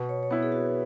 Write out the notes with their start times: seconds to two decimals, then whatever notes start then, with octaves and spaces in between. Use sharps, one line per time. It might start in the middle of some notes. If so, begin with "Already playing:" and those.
Already playing: B2 B4
0.09 C#5
0.23 C#5
0.30 B3 E4 B4
0.43 G#4
0.52 F#4